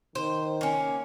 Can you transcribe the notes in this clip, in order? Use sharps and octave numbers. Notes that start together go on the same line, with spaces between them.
D#3 C5
A#3 C#4